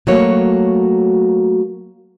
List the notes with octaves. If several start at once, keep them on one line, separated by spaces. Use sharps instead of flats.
F#3 A3 A#3 F#4 C#5